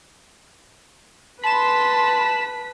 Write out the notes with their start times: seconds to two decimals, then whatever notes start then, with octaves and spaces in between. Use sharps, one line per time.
1.44 B4 A5 B5 C6 B6 E7